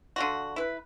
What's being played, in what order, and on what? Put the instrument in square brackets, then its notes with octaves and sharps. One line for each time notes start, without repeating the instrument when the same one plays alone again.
[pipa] D3 F4 F#4
E4 B4